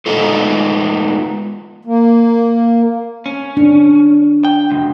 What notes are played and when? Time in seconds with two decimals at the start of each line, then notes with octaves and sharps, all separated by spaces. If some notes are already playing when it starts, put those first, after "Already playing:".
0.06 G#3 A3 B3 D#4 F4 A4
1.85 A#3
3.26 C#4
3.57 D4
4.45 G5
4.71 C#2 F#2